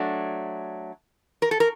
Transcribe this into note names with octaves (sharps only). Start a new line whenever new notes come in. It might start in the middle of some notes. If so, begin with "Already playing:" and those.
Already playing: F#3 A3 D4
A#4
A4
A#4